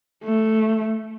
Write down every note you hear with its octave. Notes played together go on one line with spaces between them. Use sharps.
A3